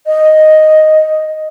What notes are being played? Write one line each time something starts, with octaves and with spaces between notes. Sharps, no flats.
D#5